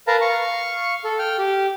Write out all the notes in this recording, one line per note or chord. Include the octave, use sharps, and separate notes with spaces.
A#4 B4 F5 A5 A#5
F5 C#6
A4
G5 F6
G4